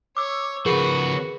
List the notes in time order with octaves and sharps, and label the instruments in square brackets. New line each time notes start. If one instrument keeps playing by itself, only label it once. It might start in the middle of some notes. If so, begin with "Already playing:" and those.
[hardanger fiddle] C#5 [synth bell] D6 E6
[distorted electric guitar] C#3 F3 [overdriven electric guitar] F#4 [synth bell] G#4 A#4 [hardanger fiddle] B4